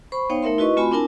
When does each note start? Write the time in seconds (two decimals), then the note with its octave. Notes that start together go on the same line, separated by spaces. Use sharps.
0.12 C5 B5 C#6
0.30 B3 D#4 C5 C#5 F5 G5
0.43 A3 D#4 A#4 E5 C6
0.58 E4 F#4 B4 D#5 C#6
0.77 A3 C4 F4 F#4 G#5 B5
0.91 C4 D4 E4 A#4 G#5 A5